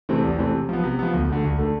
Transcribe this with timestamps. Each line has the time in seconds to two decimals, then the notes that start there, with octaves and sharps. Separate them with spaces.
0.09 C3 E3 A3 C4
0.24 E2
0.38 C3 E3 A3 C4
0.54 C3
0.69 F3 B3
0.84 C3
0.99 F3 B3
1.14 D2
1.29 D3 A3
1.44 D2
1.58 D3 A3